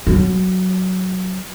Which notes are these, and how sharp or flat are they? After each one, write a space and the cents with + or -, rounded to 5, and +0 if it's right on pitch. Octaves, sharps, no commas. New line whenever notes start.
F#3 +5